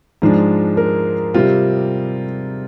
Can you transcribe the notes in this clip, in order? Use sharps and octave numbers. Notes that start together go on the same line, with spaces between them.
G#2 F3 G#3 D4
A#4
C3 G3 C4 F4